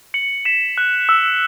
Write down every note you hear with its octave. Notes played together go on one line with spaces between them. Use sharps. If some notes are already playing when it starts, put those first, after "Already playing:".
C#7 F#7
B6 E7
F#6
E6